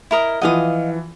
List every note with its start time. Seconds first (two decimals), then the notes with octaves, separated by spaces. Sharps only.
0.11 E4 A#4 D#5
0.41 E3 F3 D#5 F5 F#5 D#6